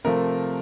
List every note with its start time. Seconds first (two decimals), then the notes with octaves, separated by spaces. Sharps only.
0.04 C3 F3 A3 A#4